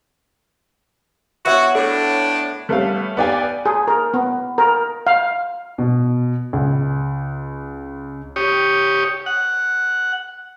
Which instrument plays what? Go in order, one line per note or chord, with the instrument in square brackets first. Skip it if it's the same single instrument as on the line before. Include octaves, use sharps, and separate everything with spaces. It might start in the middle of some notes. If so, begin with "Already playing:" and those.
[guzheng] B3 E4 [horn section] F#4 [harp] C#5 E5 F#5
[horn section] A2 D4 [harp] A4
[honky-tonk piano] G3 A3 B3 C#4 E5 F5
B3 G4 D5 F5 G5 G#5
[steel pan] G#4
A#4
B3
A#4
F5
[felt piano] B2
C#2
[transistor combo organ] G4 C#5 D#6
F#5